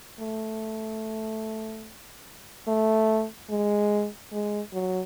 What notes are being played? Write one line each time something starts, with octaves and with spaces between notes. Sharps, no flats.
A3
A3
G#3
G#3
F#3